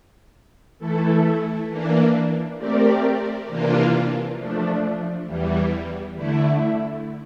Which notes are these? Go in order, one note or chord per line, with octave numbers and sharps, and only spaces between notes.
E3 A3 E4 A4
E3 A#3 D4
A3 C4 G4 A#4 D5
C3 E3 A#3 D4 F4
F3 A3 D4
E2 E3 G3
D3 A3 E4